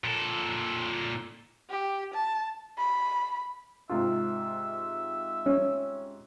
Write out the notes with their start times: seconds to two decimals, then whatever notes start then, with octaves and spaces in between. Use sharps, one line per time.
0.04 A#2 A4
1.70 G4
2.14 A5
2.78 B5
3.90 G#2 C3 F4 E5
5.46 C#4